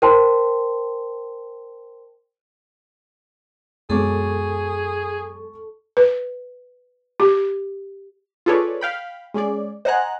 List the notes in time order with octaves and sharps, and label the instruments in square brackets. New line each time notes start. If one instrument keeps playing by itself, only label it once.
[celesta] A#4 C5 G5 A5 C6
[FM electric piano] F#2 [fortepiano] B2 G#3 D6 [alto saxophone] G#4 [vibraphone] A4 A5 C#6
[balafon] B4
G4
[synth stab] F4 G#4 A4 B4 C#5 D5
F5 G5 B5
G#3 C#4 G#4 D5
C5 D#5 F#5 G#5 A#5 F#6